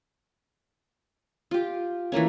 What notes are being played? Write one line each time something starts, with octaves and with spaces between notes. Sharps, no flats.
F4 G4
E3 A3 A#3 C#4